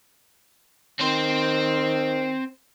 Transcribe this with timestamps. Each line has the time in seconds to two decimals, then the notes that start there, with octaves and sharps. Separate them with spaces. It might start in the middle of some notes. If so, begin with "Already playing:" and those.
1.00 D#3 C4 C5